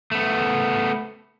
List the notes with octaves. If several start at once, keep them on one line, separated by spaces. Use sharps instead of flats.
A3 B3